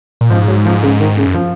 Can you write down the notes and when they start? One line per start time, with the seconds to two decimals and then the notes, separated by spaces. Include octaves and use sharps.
0.21 A#2
0.30 G#2 F3
0.48 F#3
0.65 F3
0.83 C#3
1.00 D#3
1.17 C#3
1.26 F#2
1.34 F3